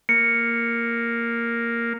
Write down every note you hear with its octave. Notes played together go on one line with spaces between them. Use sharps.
A#3 C#7